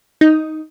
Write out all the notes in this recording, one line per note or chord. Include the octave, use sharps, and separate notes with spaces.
D#4